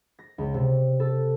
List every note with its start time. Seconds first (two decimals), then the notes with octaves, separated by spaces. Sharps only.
0.19 A#6
0.38 C#2
0.54 C3
1.00 A4